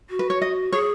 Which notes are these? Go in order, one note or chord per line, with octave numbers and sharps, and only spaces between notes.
F#4
B4
C#5
D#5
G#4 C#5